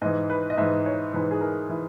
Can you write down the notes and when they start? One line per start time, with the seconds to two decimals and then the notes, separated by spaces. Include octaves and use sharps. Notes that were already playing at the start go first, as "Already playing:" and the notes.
0.01 G#2 D#5
0.05 E3
0.30 B4
0.50 D#5
0.57 G#2 E3 E5
0.86 C#5
1.13 G#2 E3 B4
1.31 G#4
1.41 A#4
1.69 E3 E4